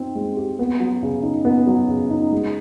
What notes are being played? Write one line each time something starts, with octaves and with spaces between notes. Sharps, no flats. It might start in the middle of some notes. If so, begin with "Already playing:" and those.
Already playing: C4 D#4
G#3
G4
B3
F#3
C#3
D#4
B3
F#3
C#3
D#4
G#3